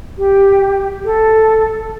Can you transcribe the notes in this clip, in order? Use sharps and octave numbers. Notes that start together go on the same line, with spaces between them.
G4
A4